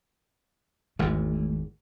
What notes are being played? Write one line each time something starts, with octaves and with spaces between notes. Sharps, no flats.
G#1 E2 G#2 A3